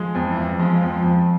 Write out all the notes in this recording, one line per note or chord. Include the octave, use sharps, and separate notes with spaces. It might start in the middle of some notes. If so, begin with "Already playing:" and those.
Already playing: F3 G#3
F2
E3
F2
F3 G#3
F2
F2